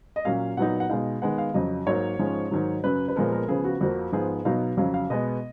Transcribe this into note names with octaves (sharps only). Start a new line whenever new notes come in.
D#5
A#2 F#3 A#3 C#4 F5
A#2 F#3 B3 D#4 F#5
F#5
B2 G#3 D#4 F5
D#3 G#3 B3 F#5
F5
F2 C#3 F#3 D#5
G#2 F#3 A#3 C#5
G#2 F3 G#3 C#4
G#2 D#3 F#3
F#2 C#3 F#3 B4
B4
A#2 F3 G#3 B3 A#4
A#4
C#3 F3 B3 G#4
F#4
F2 F3 A#3 F#4
G#2 F3 B3 G#4
B2 F#3 B3 D#4 F5
F2 C#3 F#3 F5
F5
B2 G#3 B3 D#5